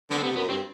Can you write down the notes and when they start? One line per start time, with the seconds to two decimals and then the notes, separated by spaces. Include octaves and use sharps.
0.10 D3 B3
0.18 C4
0.23 C3 B3
0.36 F#2 B3
0.49 G2 C4